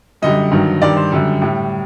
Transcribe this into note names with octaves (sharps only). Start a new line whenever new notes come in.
F#2 D3 G3 D#5
G2 D#3 F#3
G2 D#3 G3 D5
C5
F#2 D3 G3
A2 G3